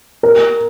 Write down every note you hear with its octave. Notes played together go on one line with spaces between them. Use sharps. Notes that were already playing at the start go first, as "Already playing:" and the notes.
A#4